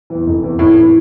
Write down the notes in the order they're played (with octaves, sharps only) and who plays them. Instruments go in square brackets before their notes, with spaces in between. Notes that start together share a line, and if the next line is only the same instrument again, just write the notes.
[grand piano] E2 E3
F1
E2 E3
[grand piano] F1 [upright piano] A2
[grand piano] E3